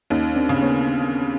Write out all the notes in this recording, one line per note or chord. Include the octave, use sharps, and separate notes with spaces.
D#2 C#4 D#4
C4 D4
C#3
B3 C#4